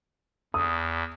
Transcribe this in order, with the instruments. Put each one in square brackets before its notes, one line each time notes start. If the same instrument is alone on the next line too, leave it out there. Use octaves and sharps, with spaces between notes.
[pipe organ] E2 [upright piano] D#6